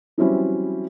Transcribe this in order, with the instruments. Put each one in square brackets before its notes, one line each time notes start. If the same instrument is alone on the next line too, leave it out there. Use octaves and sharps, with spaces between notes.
[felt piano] E3 F#3 G3 C4 C#4 E4